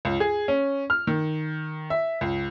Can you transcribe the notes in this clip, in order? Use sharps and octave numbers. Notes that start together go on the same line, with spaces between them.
C#2
G#4
C#4
F6
D#3
E5
C#2